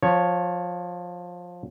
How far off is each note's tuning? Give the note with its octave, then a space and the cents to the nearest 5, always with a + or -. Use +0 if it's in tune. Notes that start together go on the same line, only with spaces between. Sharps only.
F3 +15 C#5 +0